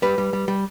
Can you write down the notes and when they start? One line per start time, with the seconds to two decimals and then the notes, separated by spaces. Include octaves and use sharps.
0.02 G3 B4
0.18 G3
0.33 G3
0.48 G3